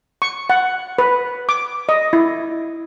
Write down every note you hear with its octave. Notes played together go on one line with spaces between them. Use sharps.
C#6
F#5
B4
D6
D#5
E4